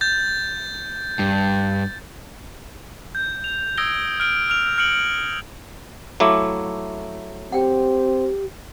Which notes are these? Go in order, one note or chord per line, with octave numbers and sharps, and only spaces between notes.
G6 A6
G2
G6
F7
D#6 E6 G#6 A#6 D7 G7
F6 D7 G7
F6 F7
F6 C#7 D7 F#7
F#3 A3 E4 F5 D6
C4 G4 F#5 G5